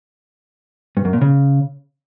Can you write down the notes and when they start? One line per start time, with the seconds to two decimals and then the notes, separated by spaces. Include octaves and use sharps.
0.97 G2
1.05 F#2
1.13 A#2
1.21 C#3